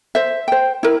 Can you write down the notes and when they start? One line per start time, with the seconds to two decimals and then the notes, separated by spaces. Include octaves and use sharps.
0.15 C5 E5
0.48 C5 G5
0.83 E4 A#4